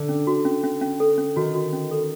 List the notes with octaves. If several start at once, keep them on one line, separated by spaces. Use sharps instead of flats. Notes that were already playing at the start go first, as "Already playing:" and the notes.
Already playing: D3
C#4
F#4
C#4
C#4
C#4
A4
C#4
D#3 F#4
F#4
C#4
A4